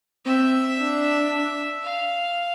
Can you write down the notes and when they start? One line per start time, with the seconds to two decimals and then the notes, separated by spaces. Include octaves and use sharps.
0.25 C4 E5
0.79 D4
1.84 F5